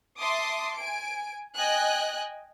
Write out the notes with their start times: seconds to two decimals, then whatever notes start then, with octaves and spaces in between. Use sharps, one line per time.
0.20 E5 A5 C6 D6 D#6
0.77 G#5 D7
1.54 D#5 G5 G#5 F#6